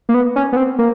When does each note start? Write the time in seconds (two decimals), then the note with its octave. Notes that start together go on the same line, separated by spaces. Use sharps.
0.09 A#3
0.14 B3
0.36 C#4
0.53 B3
0.57 C4
0.79 A#3